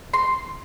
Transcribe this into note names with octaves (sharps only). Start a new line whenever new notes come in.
C6